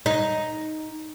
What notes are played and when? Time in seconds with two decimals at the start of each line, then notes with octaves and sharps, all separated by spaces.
0.06 D#4